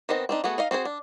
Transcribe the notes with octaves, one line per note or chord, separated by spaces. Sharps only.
D#3 B3 C4 D#5
C4 D4 D#4
A3 B3 F#4 G#4
D#4 D#5 F5
C4 F#4 G#4 C5
D4